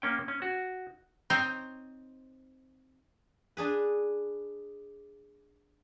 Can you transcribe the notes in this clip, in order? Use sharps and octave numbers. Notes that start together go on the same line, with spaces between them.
A#3 C#4 G5
C#4
F#4
C4 D#4 C5 C#5
D4 G#4 B4